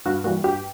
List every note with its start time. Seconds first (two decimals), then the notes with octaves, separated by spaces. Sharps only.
0.05 G2 F#4
0.24 E3 G3 A#3 F#4
0.44 G2 G4